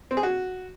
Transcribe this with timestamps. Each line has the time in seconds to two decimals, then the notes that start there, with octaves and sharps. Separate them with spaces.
0.11 C4
0.17 G#4
0.23 F#4